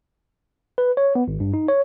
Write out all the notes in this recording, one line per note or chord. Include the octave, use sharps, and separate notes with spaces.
B4
C#5
B3
G#1
G2
D#4
C#5